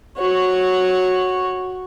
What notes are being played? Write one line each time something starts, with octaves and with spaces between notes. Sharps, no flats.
F#4 C#5